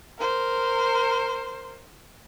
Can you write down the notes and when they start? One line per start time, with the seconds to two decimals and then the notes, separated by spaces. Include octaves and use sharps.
0.18 A#4 C5